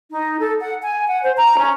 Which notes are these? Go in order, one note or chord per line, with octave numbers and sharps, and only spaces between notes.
D#4
A4
F#5
G#5
F#5
C5
A#5
C#4